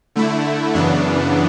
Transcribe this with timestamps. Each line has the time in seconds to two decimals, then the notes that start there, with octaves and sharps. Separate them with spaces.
0.16 D3 A3 E4
0.74 F#2 C#3 E3 B3 D4